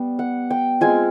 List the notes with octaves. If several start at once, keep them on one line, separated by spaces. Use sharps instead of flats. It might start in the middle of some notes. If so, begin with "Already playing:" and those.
Already playing: G3 B3
F#5
G5
G#3 C4 F4 G#5